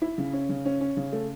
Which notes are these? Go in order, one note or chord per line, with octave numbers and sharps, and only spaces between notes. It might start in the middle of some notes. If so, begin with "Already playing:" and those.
E4
C#3
C#4
C#3
C#4
C#4
C#3
A3